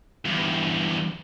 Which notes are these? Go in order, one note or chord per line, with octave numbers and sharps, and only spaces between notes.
E2 G2